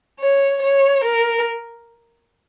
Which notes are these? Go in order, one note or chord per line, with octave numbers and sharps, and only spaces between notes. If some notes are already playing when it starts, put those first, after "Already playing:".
C#5
C#5
A#4